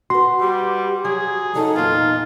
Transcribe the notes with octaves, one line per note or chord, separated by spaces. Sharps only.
F#4 B4 C6
G3 G4
F#3 G#4
F#3 C#4 D#4 A4
E2 A#2 F4